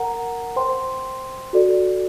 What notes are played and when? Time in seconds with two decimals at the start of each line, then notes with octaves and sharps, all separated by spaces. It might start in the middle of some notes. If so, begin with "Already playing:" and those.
Already playing: A#4 F#5 A#5
0.56 C5 G5 C6
1.53 F#4 A4 D5